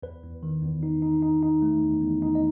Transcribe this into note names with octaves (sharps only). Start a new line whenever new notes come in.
E2 B4
E2
D#3
E2
D#4
D#4
D#4
D#4
A3
E2
E2
D#4
D#5